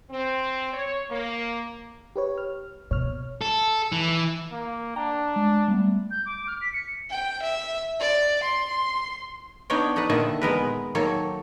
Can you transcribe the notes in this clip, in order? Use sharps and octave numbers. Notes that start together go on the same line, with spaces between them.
C4
C#5
A#3
G4 B4 C#5
F6
B2 C#5 F6
A4
E3
A#3
D4 G5 A#5
G#3
G3 A3 B3
G6
D6
F6
B6
C#7
G5
E5
D5
C6
B3 D4 D#4 C#5 D5 G5
D#4 A4 B4 F#5
A#2 D3 D#3 E4 D#5 A5
G#3 B3 A#4 B4
D#3 F#3 A#3 A4 C#5